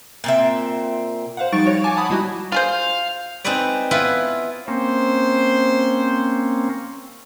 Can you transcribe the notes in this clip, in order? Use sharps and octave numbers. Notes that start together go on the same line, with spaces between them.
A#2 C4 E5
C5 F5 F#5
F3 G3 D#4 C#6 A6 D7
F#4 C#5
G#5 A5 D6
F#5 A5 B5 D#6
G3 D#4 E4 F#4
F4 G#4 C5 F5
C4 D#4 G#4 B4 D5
B3 E4 F4 B4
A#3 C4 C#4 C5